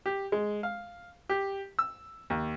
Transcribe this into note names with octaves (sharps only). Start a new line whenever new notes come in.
G4
G#3
F5
G4
E6
D#2